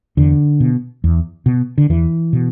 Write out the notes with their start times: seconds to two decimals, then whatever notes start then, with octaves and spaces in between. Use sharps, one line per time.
0.17 E2 D3
0.60 B2
1.04 E2
1.46 B2
1.78 D3
1.90 E2 E3
2.33 B2